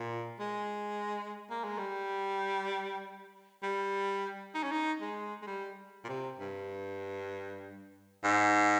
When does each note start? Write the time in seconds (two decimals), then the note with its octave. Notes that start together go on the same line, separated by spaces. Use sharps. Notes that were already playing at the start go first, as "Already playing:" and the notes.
Already playing: A#2
0.40 G#3
1.50 A#3
1.64 G#3
1.78 G3
3.63 G3
4.55 D#4
4.63 C#4
4.72 D#4
5.01 G#3
5.42 G#3
5.47 G3
6.05 A#2
6.09 C3
6.39 G2
8.24 G#2